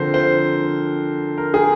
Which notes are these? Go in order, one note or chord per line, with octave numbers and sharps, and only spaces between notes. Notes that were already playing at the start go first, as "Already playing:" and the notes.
Already playing: D3 F3 C4 A#4 C5
C5
A#4
G#4